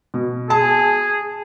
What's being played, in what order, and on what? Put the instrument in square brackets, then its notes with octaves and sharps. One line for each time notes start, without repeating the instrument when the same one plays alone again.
[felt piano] B2
[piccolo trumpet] G#4 [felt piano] A5